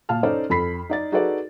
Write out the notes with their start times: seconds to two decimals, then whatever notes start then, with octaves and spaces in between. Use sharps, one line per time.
0.09 A#2 F5 A5 F6
0.23 C#4 D#4 A4 C5 D5
0.50 F2 A4 B5 B6 C7
0.90 D#4 D5 A6
1.12 D#4 F#4 G#4 A4 B4 D5